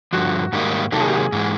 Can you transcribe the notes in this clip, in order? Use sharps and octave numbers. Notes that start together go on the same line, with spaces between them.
G2 D3 F3 F#4
G#2 D#3 G3 A#3 D#4
C3 D#3 F#3 A#3 D#4 A4
G#4
G4
G#4
G#2 E3 G#3